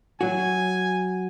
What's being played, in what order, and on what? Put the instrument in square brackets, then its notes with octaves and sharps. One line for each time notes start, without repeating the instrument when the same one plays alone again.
[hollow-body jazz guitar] F#3 F#4 [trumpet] G#5